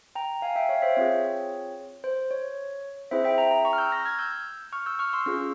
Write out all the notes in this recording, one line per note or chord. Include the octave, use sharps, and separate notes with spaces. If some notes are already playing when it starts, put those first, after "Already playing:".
G5 A#5
F5 G#5
E5 G5
C#5 F5
C5 E5
C4 F4 G#4 C#5
C5
C#5
C4 E4 G#4 C5 E5
E5 G5
G5 A#5
G5 A#5
A#5 C#6
F6
E6 G6
G6 A#6
F6 G#6
E6 G6
C#6 F6
E6 G6
C#6 F6
C6 E6
C#4 F4 G#4